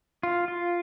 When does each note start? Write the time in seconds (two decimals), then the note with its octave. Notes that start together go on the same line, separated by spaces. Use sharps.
0.23 F4
0.48 F4